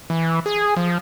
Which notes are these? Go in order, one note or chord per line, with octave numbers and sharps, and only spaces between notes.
E3
G#4
F3